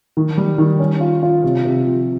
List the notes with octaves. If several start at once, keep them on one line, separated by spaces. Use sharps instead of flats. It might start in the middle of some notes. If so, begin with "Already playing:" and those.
D#3
G3
D#3
C#4
F4
F4
C3
C3
F3